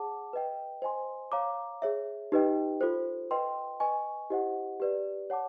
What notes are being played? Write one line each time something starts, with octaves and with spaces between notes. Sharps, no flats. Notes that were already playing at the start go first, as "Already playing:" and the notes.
Already playing: G#4 C#5 F#5 A5 D6
B4 D#5 G5
C5 D#5 G#5 C6
C#5 F5 A#5 D6
G#4 C#5 E5
D#4 G4 B4 D#5 G5
F4 A4 C5
B4 D#5 G5 C6
B4 D#5 G#5 C#6
E4 G4 C5 D#5 F#5
G4 B4 D5
C#5 F#5 A5 D6